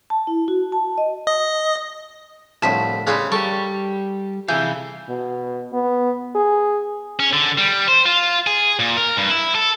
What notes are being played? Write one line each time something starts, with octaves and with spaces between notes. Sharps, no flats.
A5
E4
F#4
A5
D#5
D#5
C2 A2 D3 F3 A5 B6
C#3 G3 G#3 C#4 D4 B4
G3 G4 A4 A#4 C#6
C3 E3 G#4 A4 E5 F5 G6
B2
B3
G#4
C#4
D3
G3
C5
F4
G#4
A#2
A#4
G2
E4
A4